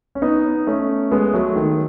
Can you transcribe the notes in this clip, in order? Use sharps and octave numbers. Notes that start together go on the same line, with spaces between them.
C#4
B3 D#4
A3 C#4
G#3 B3
F#3 A3
D#3